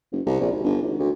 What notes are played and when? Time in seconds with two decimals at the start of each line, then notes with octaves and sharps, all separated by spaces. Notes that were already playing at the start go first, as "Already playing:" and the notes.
0.12 F#1
0.26 C2
0.40 A#1
0.52 G#1
0.64 G1
0.82 G#1
0.99 D2